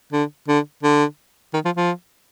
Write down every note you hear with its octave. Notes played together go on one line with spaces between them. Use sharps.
D3
D3
D3
D#3
F3
F3